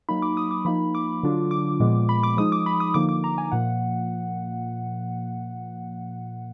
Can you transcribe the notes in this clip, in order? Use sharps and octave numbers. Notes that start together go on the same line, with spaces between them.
F#3 A#3 D#4 B5
D6
D#6
D6
F3 A#3 D#4 B5
D6
D3 F#3 D4 F4
D6
A#2 F3 G#3 B3
B5
D6
F3 G#3 D#4 D#6
D6
B5
D#6
D3 F3 A#3 D#4 D6
D6
A#5
G#5
A#2 F3 A#3 F#5